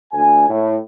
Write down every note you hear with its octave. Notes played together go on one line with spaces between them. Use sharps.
D2 G#5
A2